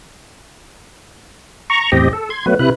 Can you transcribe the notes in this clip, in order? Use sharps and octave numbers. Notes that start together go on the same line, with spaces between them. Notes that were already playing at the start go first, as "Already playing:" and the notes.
A#5 C#6
E2 A2 C4 G4 D#5
A4
C6 G#6
F#3 A3 B3 B4
C3 E4 B4 F#6